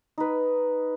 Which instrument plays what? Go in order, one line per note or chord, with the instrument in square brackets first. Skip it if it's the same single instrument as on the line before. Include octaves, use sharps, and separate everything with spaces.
[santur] D#4 B4